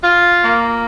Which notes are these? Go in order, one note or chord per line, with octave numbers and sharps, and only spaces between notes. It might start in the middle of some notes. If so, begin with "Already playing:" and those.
F4
A#3